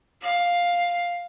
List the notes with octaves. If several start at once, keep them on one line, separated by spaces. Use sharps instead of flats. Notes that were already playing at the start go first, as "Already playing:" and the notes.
F5